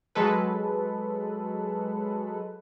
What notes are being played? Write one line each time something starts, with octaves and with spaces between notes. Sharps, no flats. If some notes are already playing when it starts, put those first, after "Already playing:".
F#3 G#3 A4 B4